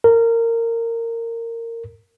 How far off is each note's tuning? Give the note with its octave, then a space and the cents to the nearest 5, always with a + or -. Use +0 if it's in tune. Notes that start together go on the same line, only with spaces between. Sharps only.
A#4 -20